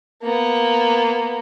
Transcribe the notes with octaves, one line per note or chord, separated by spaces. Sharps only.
A#3 B3